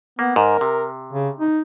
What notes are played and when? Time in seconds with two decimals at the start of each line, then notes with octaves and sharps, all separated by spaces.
0.19 A#3 B3
0.36 G#2 A#4
0.61 C3
1.13 C#3
1.40 D#4